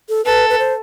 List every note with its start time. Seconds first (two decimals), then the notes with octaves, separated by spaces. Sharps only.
0.09 A4
0.25 A4 B4
0.50 B4
0.59 C5